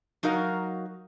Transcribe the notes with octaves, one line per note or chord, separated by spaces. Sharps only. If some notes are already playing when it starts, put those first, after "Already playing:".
F#3 D#4 F#4 A#4 F5